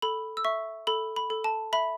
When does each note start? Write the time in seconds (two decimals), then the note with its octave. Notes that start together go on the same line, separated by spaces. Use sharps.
0.02 A4 B5
0.37 E6
0.45 E5 C#6
0.87 A4 B5
1.16 B5
1.30 A4
1.44 A5
1.73 E5 B5